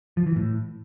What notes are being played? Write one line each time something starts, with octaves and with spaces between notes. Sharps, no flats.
F3
E3
A2